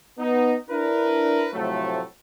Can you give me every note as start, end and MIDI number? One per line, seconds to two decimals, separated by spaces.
0.19 0.55 59
0.19 0.55 63
0.70 1.48 62
0.70 1.48 64
0.70 1.48 70
0.70 1.48 71
1.54 2.02 45
1.54 2.02 48
1.54 2.02 53
1.54 2.02 54
1.54 2.02 57